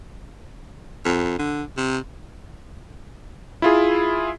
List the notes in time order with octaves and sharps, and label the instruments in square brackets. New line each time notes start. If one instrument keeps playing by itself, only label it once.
[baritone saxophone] F2
D3
C3
[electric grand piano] E4 F4 G#4